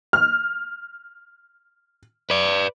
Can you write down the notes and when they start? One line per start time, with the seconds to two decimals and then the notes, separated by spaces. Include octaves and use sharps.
0.13 F6
2.30 B4 D5